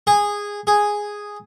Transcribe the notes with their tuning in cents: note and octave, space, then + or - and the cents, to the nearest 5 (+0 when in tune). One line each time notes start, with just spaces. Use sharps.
G#4 -15
G#4 -5